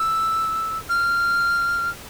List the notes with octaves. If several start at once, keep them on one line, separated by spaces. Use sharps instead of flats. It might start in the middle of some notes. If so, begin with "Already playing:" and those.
Already playing: E6
F6